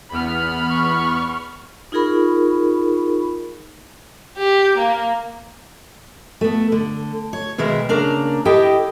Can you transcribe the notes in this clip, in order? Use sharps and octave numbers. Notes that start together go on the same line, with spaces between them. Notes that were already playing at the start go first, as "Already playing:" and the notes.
E2 B3 B5 F6
C#6
D#4 F4 G#4 A#4 B5 C#6
G4
A#3
A3 B3
D3
C#5
B2 D#3 G#3 A#4 E5
C#3 A#3 D4 A#5
E4 G4 A4 D#5 G5